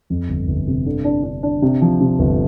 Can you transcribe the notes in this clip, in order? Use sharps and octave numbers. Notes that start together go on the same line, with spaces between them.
F2
G1
G1
C3
D3
D4
D4
D4
C3
F3
C3
G1